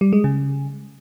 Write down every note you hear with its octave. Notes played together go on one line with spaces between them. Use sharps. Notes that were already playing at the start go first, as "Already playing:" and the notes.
G3
G#3
C#3